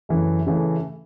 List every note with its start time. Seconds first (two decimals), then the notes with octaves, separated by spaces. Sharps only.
0.09 F#2 C#3 E3 A3
0.47 C#3 E3 A3